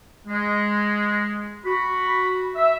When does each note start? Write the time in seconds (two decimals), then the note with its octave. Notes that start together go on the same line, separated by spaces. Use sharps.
0.28 G#3
1.65 F#4 B5
2.56 E5